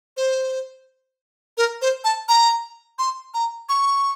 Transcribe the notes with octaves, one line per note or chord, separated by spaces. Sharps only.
C5
A#4
C5
A5
A#5
C6
A#5
C#6